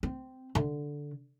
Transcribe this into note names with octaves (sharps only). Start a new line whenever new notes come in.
C4
D3